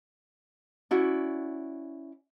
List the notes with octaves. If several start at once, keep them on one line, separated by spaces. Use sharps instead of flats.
C#4 E4 F#4 D5